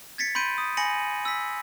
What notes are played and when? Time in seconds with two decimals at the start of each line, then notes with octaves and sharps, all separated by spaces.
0.18 G#6 A6 B6 C#7
0.35 B5 C6 G6 D7 D#7
0.58 D#6
0.77 G#5 B5 A#6 C#7 D#7 F#7
1.25 E6 B6